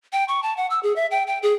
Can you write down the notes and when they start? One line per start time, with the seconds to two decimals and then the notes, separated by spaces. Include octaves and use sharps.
0.13 G5
0.28 C#6
0.43 A5
0.57 F#5
0.70 E6
0.83 G#4
0.96 E5
1.11 G5
1.27 G5
1.43 G#4